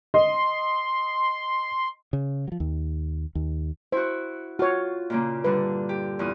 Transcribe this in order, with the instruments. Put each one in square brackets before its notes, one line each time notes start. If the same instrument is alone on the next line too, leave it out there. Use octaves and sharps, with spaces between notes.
[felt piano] D#5 [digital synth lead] C6
[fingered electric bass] C#3
F3 F#3
D#2
D#2
[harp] E4 F#4 [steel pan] C5
[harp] F4 [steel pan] F#4 C#5
[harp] A#2 C#3 A#3
[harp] G2 D3 [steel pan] B4
[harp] G4
E2 A#2 D#6